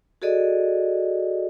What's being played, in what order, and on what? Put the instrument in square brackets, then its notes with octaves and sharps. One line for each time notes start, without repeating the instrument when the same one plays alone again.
[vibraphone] F#4 G#4 A4 D5 D#5